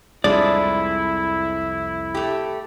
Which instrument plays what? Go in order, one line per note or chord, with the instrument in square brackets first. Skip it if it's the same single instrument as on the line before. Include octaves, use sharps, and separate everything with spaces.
[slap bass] C2 F2 [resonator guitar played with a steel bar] F3 G#3 D4 [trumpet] E4 [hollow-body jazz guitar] D5
[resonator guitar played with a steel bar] A3 G4